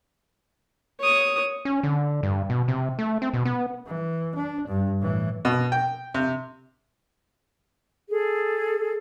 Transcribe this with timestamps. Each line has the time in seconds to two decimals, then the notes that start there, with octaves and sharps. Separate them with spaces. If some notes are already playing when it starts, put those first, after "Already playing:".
1.00 C#5 D#6
1.65 C#4
1.83 D3
2.23 G2
2.50 B2
2.68 C3
2.99 A3
3.22 C4
3.34 B2
3.45 B3
3.87 E3
4.36 D4
4.68 G2
5.01 A2 E3
5.45 B2
5.72 G5
6.15 C3
8.10 G#4 A4